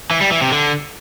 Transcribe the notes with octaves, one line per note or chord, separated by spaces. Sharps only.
E3
G3
E3
C3
D3